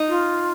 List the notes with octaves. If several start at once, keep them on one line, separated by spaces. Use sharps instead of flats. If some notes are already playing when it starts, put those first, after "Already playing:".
Already playing: D#4
F4